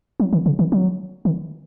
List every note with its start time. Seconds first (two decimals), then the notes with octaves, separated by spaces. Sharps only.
0.20 F#3
0.33 D#3
0.46 C#3
0.59 D#3
0.72 F#3
1.25 D#3